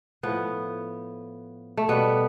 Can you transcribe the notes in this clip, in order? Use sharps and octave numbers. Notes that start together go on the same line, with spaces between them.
A2 F3 B3
A3
B2 G3 B3